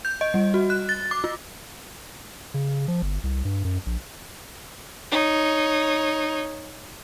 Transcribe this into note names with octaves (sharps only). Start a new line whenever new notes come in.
G6
D#5
G3
F#4
F#6
A6
D6
F4
C#3
F3
G1
C2
G2
F#2
A#1
D#4 C#5